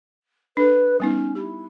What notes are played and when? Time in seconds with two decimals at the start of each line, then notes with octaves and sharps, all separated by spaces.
0.57 D4 A4 B4
1.00 G3 B3 C#4 D#4
1.35 E4 G4